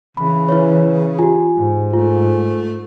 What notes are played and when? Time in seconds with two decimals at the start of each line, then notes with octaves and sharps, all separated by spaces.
0.17 C#3 E3 B5
0.49 E4 B4 C#5
1.19 F4 G4 G#5
1.57 G#2
1.93 A3 F4